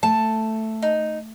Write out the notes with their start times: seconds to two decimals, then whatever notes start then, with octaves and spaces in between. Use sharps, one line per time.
0.03 A3 A5
0.82 D#4